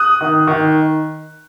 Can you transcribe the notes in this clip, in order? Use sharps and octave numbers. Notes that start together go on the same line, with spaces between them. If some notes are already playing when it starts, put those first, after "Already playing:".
Already playing: D#6 F#6
D#3
D#3